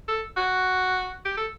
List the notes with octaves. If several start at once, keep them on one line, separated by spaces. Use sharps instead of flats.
A4
F#4
G4
A4